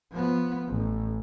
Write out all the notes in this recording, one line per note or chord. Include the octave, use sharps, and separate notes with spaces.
F3 B3
A1